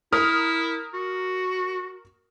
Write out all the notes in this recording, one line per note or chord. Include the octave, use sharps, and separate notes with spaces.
E4 A#4 D#6 F6
F#4